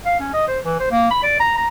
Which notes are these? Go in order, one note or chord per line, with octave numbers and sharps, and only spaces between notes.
F5
C#4
D#5
C5
E3
C5
A#3
B5
D5
A#5
A#5